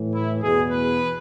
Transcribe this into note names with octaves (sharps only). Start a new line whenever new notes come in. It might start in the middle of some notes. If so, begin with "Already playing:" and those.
Already playing: A2 E3
E4
E2 B2 G#4
B4